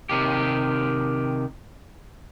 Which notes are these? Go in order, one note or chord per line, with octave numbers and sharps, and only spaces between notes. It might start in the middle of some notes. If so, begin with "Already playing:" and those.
C3 D#3 G4